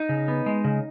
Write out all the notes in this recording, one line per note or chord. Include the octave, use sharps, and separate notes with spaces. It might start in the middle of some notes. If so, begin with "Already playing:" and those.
Already playing: D#4
C#3
B3
G#3
C#3